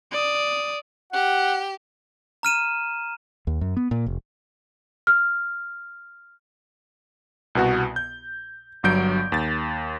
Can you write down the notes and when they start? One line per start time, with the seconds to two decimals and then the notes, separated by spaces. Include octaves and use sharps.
0.12 D5 D#6
1.13 G4 F#5
2.43 A#5 F6 D#7 E7
3.47 D#2
3.61 F#2
3.77 B3
3.91 A#2
4.07 F1
5.07 F6
7.55 C2 B2 B3 F#4
7.96 G6
8.83 G1 G2 F#3 G6 D7
9.32 D#2 A6